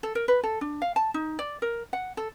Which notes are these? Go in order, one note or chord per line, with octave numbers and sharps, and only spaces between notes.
A4
A#4
B4
A4
D4
F5
A5
D#4
D5
A#4
F#5
A4